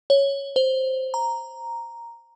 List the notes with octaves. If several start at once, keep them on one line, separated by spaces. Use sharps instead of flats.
C#5
C5
A#5